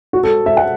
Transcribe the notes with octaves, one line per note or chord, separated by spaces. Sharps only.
F#4
A4
E5
F#5